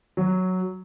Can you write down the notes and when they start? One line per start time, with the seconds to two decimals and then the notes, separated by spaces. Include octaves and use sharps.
0.17 F#3